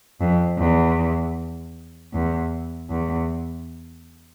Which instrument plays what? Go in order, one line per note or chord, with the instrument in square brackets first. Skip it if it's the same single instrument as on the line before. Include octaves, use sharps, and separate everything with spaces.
[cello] F2
E2
E2
E2